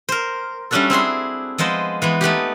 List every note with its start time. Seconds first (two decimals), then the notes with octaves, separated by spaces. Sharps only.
0.09 A#4 C5
0.71 G3 A3 C#4 D4 F#4 A4
0.90 C4 E4 G#4 C6
1.58 F3 G#3 B3 C5 D#5
2.02 E3 G#3 B3
2.21 A3 B3 D#4 G4